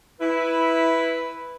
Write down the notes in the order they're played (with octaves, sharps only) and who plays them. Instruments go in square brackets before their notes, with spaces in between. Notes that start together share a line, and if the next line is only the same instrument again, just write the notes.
[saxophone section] E4 [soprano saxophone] B4